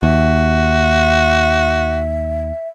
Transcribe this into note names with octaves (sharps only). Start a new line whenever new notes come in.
D#2 F#4 E5